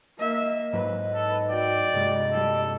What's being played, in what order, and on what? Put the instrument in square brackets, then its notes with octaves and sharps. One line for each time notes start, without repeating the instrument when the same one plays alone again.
[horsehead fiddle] A#3 E5 [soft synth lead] D#5
[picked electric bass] G#2 F#3 [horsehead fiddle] B4
[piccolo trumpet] A4
[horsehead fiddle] F#4 G5 [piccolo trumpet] D5
[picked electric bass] G2 C3 G#3
[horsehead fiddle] G3 [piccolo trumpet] A4